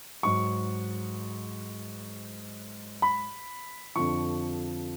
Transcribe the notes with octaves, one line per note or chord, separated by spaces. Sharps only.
G#2 F#3 C#6
B5
F2 D3 F3 C#6